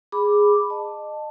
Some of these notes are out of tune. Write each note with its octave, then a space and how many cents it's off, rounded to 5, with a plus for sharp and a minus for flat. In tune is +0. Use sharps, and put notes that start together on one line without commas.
G#4 -5 B5 +0 D6 +0
D#5 -30 A5 +5